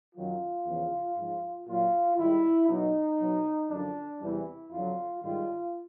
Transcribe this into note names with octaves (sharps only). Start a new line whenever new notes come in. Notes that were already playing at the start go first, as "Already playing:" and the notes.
F#2 D#3 F#3 F4
E2 C#3 F3
G#2 F3
A#2 F#3 F4
G#2 D#3 G3 E4
B2 F#3 D#4
B2 F#3
F#2 D3 F3 D4
E2 C3 E3 G3 E4
F2 D3 F#3 F4
G#2 D#3 G3 F4